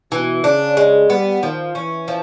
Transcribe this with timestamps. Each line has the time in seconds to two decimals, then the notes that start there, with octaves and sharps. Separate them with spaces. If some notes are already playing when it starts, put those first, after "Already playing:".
0.12 B2 E3
0.44 C#3 D4
0.77 G#3
1.10 G3 B3
1.43 D#3 F3
1.75 E3 C#4
2.08 F3